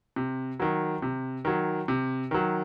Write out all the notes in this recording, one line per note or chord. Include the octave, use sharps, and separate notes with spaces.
C3
D#3 F#3
C3
D#3 F#3
C3
D#3 F#3